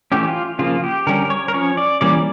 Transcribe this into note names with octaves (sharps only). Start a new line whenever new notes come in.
E3 A3 C#4 G4
F4
C#3 F3 A#3 F4
G4
D3 G3 C#4 A#4
C#5
A#4
F3 C#4 C#5
D5
E3 G3 A#3 C#4 D5